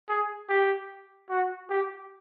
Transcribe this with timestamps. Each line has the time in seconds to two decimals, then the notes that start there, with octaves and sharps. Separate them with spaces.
0.09 G#4
0.49 G4
1.29 F#4
1.69 G4